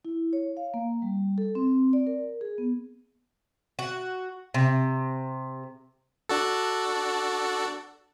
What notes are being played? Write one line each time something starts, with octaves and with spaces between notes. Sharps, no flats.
E4
C#5
F5
A#3
G3
A4
C4
D5
A#4
G#4
B3
F#4
C3
D4 F#4 A4